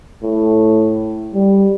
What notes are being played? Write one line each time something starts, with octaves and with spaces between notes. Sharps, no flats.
A2
G3